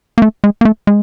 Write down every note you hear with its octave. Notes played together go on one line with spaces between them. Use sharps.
A#3
A3
G#3
A#3
A3
G#3